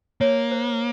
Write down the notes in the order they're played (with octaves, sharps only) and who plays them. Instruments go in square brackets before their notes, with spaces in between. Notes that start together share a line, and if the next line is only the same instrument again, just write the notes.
[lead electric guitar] A#3 [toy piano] C#5
[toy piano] C5